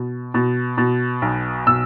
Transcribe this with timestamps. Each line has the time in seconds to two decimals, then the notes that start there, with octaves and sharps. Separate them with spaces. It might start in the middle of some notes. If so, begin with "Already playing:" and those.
Already playing: B2
0.34 B2
0.78 B2
1.22 B1
1.67 B2 E6